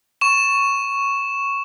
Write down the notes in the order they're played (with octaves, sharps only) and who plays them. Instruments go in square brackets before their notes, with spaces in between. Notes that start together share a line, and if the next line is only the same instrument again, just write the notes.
[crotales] C#6 E7